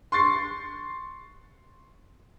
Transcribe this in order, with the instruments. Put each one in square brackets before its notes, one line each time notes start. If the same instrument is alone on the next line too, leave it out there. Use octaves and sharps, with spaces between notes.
[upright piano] C6 C#6 A6 C7